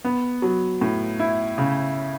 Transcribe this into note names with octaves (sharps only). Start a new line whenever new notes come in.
B3
F#3
A2
E4
C#3